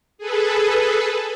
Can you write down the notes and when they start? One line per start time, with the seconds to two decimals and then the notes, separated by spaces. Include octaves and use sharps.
0.18 G#4 A4 B4